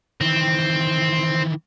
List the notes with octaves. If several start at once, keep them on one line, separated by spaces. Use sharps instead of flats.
D#3 E3 C4